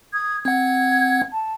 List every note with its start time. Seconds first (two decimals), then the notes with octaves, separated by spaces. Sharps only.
0.13 D#6 G#6
0.45 C4 F#5 G#6
1.31 A5